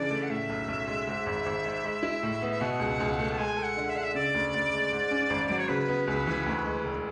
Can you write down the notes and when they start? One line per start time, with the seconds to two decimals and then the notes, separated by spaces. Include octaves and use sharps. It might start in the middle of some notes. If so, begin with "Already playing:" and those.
Already playing: C#3 E3 D4 D5
0.10 A3
0.22 F#5
0.30 A2 E5
0.50 B1
0.68 B1
0.87 G#3
1.07 G#2
1.26 G#1
1.46 G#1
1.64 G#3
1.84 G#3
2.03 E4
2.23 A2
2.42 B3
2.51 E5
2.60 B2 F#5
2.80 C#2
3.00 C#2
3.19 A3
3.32 A5
3.38 G#3 G#5
3.57 A4
3.63 F#5
3.77 D3
3.89 E5
3.95 D4 F#5
4.04 E5
4.15 C#3 D5
4.34 D2
4.54 D2
4.73 G#3
4.92 G#2
5.11 C#4
5.30 G#1
5.50 F#3
5.59 C#5
5.68 C#3 B4
5.88 B3
6.07 C#2
6.27 E3
6.46 D2
6.65 G#3
6.84 E1